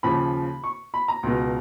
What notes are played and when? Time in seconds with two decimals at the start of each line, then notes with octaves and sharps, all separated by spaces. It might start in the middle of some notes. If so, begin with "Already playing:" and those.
0.03 D#2 C#3 F3 B5
0.64 C#6
0.94 B5
1.08 A#5
1.23 C#2 B2